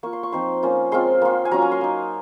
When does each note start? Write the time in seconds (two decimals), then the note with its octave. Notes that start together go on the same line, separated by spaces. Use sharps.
0.03 A#3 F4 C#6
0.13 C6
0.23 C#6
0.32 F3 C4 D#4 C6
0.63 A#3 C#4 F4
0.92 G#3 C4 F4 C6
1.22 A#3 F4
1.45 G#5
1.51 F#3 C#4 F4 A#5
1.62 G#5
1.72 C6
1.81 A#3 D#4